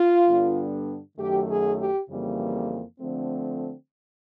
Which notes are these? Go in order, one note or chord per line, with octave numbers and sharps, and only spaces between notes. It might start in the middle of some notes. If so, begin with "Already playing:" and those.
Already playing: F4
G2 D3 G3 B3 D4
F#2 D#3 F#3 A3 G4
G#4
G4
F2 C#3 E3 G3 A#3
D3 F3 A3 C4